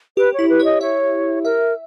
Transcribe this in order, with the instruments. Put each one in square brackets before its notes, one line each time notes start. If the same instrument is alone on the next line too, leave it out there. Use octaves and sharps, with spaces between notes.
[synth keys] G4 [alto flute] B4
[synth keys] E4 [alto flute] C#5
[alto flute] B4
[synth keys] C#5
[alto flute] D#5
[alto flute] C#5 [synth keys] E5
[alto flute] A#4 [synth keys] E5